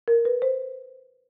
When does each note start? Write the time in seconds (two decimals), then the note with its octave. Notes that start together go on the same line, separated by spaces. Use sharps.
0.08 A#4
0.25 B4
0.42 C5